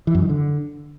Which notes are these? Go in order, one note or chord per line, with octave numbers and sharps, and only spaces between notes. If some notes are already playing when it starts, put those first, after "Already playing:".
E3
F#2
D#3
D3